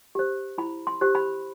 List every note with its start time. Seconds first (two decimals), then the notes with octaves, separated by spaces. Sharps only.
0.15 G4 C5
0.58 E4 B5
0.87 C6
1.01 G4 C5
1.15 B5